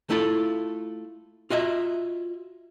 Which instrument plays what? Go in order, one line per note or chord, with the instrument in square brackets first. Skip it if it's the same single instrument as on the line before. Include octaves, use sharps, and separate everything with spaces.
[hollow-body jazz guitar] A3 E4 F4 A4
F4 F#4 D#5 E5